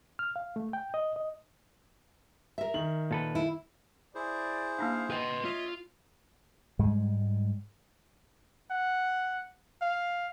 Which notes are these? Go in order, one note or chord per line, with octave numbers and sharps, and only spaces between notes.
F6
F5
A3
G5
D#5
D#5
A#4 E5
D#3 F#7
A#2 A4 B4
E4
E4 G#4 C5 D5
A#3 D4 D#4 F5
B4 D#5 G5 C6
F4 C#5 D#5 E5
G#2 G3 G#3
F#5
F5